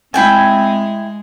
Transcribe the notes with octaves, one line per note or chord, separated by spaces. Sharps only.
G#3 C4 E4 G5 G#5